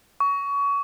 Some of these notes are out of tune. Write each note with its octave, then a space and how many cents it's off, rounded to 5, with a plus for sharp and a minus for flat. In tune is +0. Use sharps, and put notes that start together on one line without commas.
C#6 +25